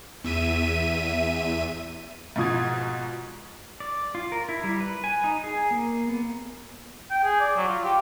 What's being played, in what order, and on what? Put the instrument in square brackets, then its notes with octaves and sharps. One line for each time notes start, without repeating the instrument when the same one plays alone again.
[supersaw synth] E2 E5 D#7
[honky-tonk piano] G#2 B2 F3 D#6 G#6
[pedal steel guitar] D5
F4
A#4
E4
G3
B4
G#5
D#4
G#4
A#3
B3
[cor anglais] G5
G#4
D5
F#3
F4
G4